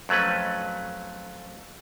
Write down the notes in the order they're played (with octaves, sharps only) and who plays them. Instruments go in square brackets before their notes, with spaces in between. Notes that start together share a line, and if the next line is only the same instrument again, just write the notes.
[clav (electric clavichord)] F2 F#3 A3 C#4 B4